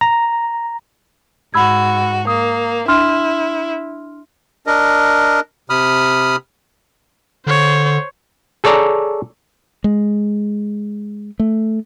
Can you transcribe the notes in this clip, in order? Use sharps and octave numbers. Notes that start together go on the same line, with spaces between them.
A#5
G#2 F#4 B5 E6 G#6
A#3 D#6
D4 E4 C6 F6
D4 A#4 D#5
C3 B5 D#6 F6
D3 C5 C#5
G#4 A4 C#5 D5 A#5
G#3
A3